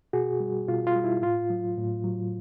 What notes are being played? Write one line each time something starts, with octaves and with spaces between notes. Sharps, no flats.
B2 F#4 G#4
G3
B2 F4
F4
G3
E4
A2 F4
F#3
A2
F#3